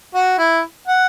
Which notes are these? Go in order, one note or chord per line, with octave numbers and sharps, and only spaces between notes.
F#4
E4
F#5